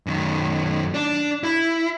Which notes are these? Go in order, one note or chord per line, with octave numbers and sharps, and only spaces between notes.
F#2 D#3
D4
E4